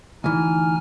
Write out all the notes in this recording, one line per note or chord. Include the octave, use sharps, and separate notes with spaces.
D2 E3 D#4 G#5 F6